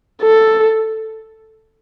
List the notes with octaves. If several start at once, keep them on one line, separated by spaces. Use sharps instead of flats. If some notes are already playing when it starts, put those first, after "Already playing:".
A4